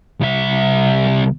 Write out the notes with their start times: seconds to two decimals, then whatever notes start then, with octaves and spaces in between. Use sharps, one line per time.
0.21 C2 E5